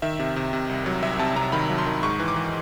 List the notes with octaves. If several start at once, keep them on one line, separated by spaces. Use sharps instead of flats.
D#3 E5
C3
C3
C3
C2
F#3
C2 E5
C3 A5
C3 A#5
D#3 B5
F#3
C6
D#3
G#2 C#6
E3
D6
E3